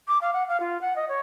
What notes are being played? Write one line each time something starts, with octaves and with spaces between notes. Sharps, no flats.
D6
F5
F#5
F5
F4
F#5
D#5
C#5